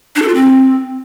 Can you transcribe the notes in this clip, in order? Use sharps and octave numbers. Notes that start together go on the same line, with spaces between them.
D4
A4
F4
C4